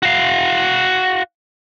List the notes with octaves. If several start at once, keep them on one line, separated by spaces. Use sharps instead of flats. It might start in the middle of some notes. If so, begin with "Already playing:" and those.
F#4 F5